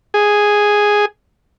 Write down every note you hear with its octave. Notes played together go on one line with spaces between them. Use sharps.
G#4